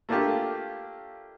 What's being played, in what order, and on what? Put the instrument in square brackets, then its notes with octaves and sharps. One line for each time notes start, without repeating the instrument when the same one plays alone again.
[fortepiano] A3 A#3 D4 F4 G4